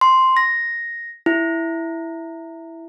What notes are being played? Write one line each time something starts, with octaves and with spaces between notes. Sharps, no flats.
C6
A#6
E4